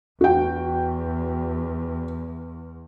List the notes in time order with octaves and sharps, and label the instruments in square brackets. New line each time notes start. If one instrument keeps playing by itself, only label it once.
[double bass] E2 [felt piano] F#4 G5